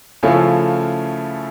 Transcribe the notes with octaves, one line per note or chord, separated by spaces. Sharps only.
C#3 F3 A3 C#4 E4